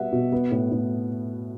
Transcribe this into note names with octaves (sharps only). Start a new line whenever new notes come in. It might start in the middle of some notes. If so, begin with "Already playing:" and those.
Already playing: B2 G3 B3 E5 F#5
B2
B3
A2
A2